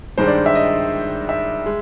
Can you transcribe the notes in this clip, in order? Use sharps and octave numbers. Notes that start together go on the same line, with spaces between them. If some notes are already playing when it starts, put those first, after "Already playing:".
G2 D#3 G#3 C5
D5
E5
D#5
E5
G#3